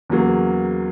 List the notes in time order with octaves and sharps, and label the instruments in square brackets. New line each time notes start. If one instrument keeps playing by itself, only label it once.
[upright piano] E2 C#3 F#3 A#3